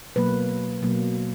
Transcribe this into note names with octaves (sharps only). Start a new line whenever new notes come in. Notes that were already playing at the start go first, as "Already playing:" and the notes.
B2 F#3 A#3 B4
B2 F#3 A#3